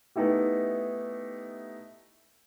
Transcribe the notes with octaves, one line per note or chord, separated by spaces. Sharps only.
A3 B3 D#4 E4 G4